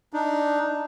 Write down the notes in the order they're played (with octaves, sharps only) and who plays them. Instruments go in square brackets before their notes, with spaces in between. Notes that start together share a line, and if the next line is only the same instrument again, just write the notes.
[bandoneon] D4 D#4